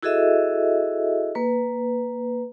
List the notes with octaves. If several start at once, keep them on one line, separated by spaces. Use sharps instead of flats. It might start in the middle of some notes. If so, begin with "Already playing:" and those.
E4 F#4 G#4 A4 D#5 E5
A#3 B4